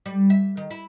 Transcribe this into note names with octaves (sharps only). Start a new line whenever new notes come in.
G3
E5
D#3
E4